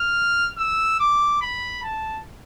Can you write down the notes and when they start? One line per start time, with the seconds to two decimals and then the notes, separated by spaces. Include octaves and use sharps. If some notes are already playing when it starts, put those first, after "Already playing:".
Already playing: F6
0.58 E6
1.00 D6
1.41 B5
1.83 A5